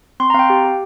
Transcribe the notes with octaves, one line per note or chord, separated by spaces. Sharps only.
C4 C6
A#5
C4 F5
G5
G4
G4